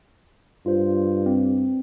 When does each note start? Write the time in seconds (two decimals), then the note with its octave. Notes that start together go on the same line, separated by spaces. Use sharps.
0.66 G2 F4 C5
1.26 C4